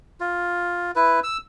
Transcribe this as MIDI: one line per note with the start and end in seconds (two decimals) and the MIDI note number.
0.20 0.91 65
0.96 1.20 64
0.96 1.20 71
1.23 1.38 88